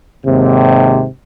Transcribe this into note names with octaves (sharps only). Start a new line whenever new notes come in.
D#2 G#2 C3